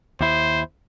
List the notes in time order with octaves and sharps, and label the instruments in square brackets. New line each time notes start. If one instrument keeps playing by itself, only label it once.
[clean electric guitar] D#2 E4 [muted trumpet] C5